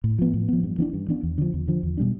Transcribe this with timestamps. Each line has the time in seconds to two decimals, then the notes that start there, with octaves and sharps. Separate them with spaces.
0.04 A2
0.19 F3 B3
0.34 A2
0.48 F3 B3
0.63 G2
0.78 E3 B3 D4
0.93 G2
1.08 E3 B3 D4
1.23 E2
1.38 D3 F3
1.54 E2
1.68 D3 F3
1.83 E2
1.97 B2 G3 D4